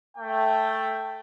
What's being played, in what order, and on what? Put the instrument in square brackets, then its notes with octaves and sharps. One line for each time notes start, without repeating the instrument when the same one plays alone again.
[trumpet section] A3 G5